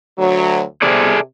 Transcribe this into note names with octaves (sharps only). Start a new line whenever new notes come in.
D2 F#3
C3 G#4 A4 D5